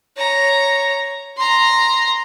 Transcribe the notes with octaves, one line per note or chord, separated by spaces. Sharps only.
C#5 A#5
A#5 C6